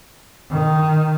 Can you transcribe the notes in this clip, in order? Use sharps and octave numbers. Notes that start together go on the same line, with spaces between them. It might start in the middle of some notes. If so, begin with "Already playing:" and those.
D#3